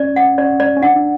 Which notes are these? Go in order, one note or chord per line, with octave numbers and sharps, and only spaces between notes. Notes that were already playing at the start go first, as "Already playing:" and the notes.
Already playing: C#4 D5
F#5
C#4 D5
D5
C#4
D4 F#5
D4